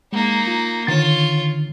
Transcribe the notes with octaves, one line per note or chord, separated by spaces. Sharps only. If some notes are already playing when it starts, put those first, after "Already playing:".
G#3 A#3 D#4
F4
D3 D#3 F4 C#5 A6